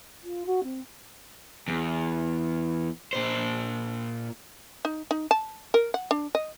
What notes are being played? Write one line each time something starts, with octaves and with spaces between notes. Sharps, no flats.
F4
F#4
C4
E2
A#2 C5
D#4
D#4
A5
A#4
F#5
D4
D#5